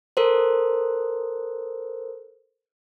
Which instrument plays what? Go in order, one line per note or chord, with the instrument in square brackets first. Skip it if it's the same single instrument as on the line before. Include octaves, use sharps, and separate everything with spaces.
[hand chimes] A4 A#4 C5